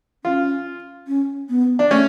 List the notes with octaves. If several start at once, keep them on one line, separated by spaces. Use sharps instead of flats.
C#4 F4
C#4
B3
D4
A3 C#4